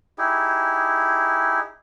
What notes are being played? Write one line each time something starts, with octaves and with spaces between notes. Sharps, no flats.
D#4 E4 G4 G#4